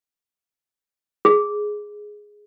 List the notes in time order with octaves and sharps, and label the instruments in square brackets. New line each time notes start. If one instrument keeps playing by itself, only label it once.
[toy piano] G#4